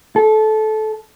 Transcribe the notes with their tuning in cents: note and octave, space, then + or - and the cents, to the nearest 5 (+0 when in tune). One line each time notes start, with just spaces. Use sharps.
A4 -20